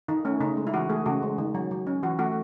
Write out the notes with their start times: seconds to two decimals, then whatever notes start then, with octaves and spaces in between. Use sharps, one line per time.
0.08 D#3 D#4
0.25 A3 C#4
0.40 C#3 D#4
0.57 G#3
0.67 E4
0.73 E3 F#4
0.90 A3 G#4
1.06 C#3 F#4
1.23 G#3
1.38 D#3
1.55 F#3
1.71 F#3
1.87 C#4
2.03 E3 F#4
2.19 A3 F#4